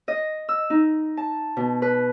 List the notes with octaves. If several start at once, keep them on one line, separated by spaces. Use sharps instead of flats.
D#5
E6
D#4
A5
B2
B4